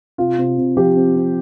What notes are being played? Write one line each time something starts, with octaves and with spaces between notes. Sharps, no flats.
C3 F4
C3
C3
F3 G4
C4
C4